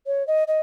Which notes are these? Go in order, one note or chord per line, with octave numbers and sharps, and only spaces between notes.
C#5
D#5
D#5